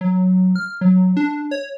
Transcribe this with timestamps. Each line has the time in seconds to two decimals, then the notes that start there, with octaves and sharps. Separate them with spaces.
0.01 F#3
0.56 F6
0.81 F#3
1.17 D4
1.51 C#5